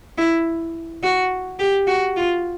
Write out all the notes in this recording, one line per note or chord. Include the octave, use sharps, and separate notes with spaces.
E4
F#4
G4
F#4
F4